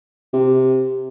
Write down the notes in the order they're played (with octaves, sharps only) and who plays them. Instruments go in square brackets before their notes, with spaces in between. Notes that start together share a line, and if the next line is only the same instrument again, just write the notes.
[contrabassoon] C3